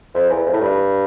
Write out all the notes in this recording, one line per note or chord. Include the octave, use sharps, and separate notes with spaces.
F2
E2
F2
A2
G2